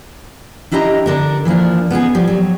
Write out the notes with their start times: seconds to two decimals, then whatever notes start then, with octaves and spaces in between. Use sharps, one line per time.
0.72 D4 E4 G4 D#5 A#5
1.06 D3 D4 A#4
1.45 E3 F3 A#3 D4
1.90 B3 D#4 G4 G#4
2.15 F3 G3 G4
2.27 F#3